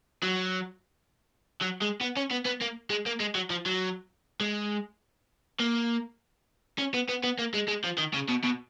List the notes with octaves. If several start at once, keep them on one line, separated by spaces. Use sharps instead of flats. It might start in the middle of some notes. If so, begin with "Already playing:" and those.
F#3
F#3
G#3
B3
C#4
B3
B3
A#3
G#3
A#3
G#3
F#3
F3
F#3
G#3
A#3
C#4
B3
B3
B3
A#3
G#3
G#3
F3
D#3
C#3
B2
B2